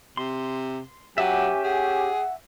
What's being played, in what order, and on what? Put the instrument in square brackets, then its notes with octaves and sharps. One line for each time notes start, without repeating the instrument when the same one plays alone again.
[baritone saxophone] C3 [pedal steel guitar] C6
[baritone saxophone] F#3 [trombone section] C#4 G4 [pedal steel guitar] E5 G#5 [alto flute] F#5
[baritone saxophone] G#4 [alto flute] F#5